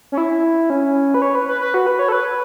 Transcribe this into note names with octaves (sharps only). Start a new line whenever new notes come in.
C#4
E4
C#4
B4
C#5
B4
B4
B4
F#4
B4
C#5
A4
B4